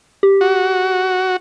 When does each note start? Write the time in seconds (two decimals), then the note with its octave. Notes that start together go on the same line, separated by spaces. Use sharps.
0.23 G4
0.41 F#4